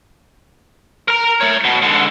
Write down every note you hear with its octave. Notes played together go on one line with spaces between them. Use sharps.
A#4 A#5
A3 C#5
B2
G#2 D3